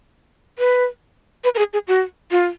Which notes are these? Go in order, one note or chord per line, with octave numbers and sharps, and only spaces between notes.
B4
B4
A#4
G#4
G#4
F#4
F4